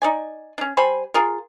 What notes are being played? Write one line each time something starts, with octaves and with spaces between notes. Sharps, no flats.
D#4 D5 G#5
C#4 D4
G3 C5 G#5 B5
F4 G#4 A#4